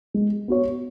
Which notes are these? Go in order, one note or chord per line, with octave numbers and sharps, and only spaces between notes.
G#3
B3 F#4 C#5